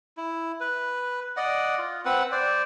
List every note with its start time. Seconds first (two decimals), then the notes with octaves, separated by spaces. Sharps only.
0.17 E4
0.61 B4
1.37 D5 D#5 F#5
1.78 F4
2.05 C4 B4 F#5
2.32 C5 D5